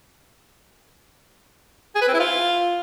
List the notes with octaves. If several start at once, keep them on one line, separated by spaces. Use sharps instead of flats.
G#4
B4
C4
E4
F4